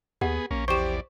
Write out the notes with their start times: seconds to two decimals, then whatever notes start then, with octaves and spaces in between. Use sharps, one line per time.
0.21 D#2 B3 G4 G#4 F#5
0.51 A#1 A#3 C#4
0.68 E2 G4 C5 D5 C#6 E7